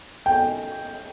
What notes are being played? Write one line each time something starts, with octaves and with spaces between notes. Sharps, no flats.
G5